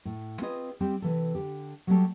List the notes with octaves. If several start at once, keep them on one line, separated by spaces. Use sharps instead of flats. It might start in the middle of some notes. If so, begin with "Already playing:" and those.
A2
C4 F4 G#4 B4 C#5 D#5
G3 C4 G4 G5
C3 E3 A4
D3 G4
F#3 G3 A3 F#4 G4 A4